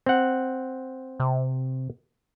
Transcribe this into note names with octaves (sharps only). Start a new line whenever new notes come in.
C4 F#5
C3